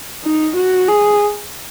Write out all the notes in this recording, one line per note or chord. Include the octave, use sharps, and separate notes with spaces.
D#4
F#4
G#4